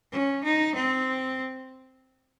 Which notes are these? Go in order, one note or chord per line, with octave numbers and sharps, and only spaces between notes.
C#4
D#4
C4